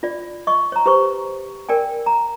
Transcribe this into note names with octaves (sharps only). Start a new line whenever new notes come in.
F4 D5
D#5 C#6
C#5 A#5
G4 B4 C5 C#6
A#4 D5 G5 G#5
A#5